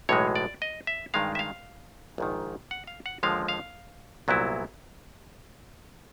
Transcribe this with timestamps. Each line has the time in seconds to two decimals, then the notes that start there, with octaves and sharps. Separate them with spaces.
0.09 B1 A2 E3 G#3 C#5
0.36 D5
0.62 D#5
0.87 E5
1.14 G2 D#3 G#3 F5
1.35 E5
1.39 F5
2.18 A#1 G#2 D#3
2.71 F#5
2.87 F5
3.06 F#5
3.23 D#2 D3 F3 G#3 F5
3.48 F5
4.28 C2 A#2 F#3 B3 E4